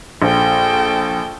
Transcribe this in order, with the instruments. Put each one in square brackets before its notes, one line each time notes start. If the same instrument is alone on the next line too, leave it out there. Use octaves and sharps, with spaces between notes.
[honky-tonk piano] A#1 [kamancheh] A4 G5